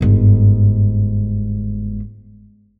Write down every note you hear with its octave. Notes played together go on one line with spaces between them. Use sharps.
G1 G#2